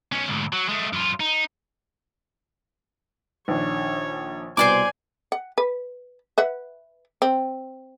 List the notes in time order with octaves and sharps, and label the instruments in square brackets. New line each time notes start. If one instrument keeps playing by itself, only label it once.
[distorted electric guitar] B1 C#4
D2 G#2
F#3
G#3 A3
F#2 F4
D#4
[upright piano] A#1 D#3 D4 [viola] C#5
[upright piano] C2 B2 [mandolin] C5 D5 D6 [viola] G#5
[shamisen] F#5
B4
B4 E5 F#5
C4